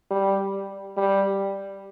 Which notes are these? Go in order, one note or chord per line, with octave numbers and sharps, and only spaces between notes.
G3
G3